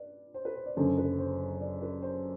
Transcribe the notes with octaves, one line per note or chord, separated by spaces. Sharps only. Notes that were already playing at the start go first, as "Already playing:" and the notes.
Already playing: B4 D5
C5
B4
C5
D5
F#1 F#2 D3 C5
B4
C5
D5
B4
C5